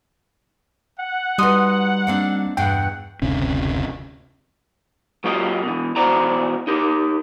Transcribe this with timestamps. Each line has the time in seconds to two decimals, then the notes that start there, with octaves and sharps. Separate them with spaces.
0.98 F#5
1.38 G3 D#4 F#4 B4 C6 D#6
2.07 A#3 C4 D4
2.57 E2 G2 B2 F#5 G5
3.22 F#1 D2 C3 C#4
5.24 F#3 A#3 F4 G4 D#5
5.63 B2 E3
5.96 B2 E3 F#4 C5 D5 A#5
6.67 D#4 G4 A#4